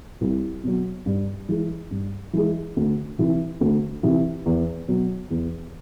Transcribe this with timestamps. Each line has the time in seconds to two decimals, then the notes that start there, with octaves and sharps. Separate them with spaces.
0.21 C2
0.63 B2 F#3
1.06 G2
1.49 E3 G#3
1.91 G2
2.33 E3 G#3
2.76 D2
3.18 C3 E3
3.61 D2
4.03 C3 E3
4.46 E2
4.88 B2 F#3
5.30 E2